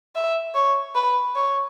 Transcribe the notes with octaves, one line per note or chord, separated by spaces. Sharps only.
E5
C#5
B4
C#5